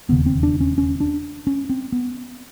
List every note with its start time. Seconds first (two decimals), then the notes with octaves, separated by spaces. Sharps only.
0.09 E1 D#2 C#3 B3
0.26 C4
0.43 D4
0.61 C#4
0.78 C#4
1.00 D4
1.47 C#4
1.69 C4
1.92 B3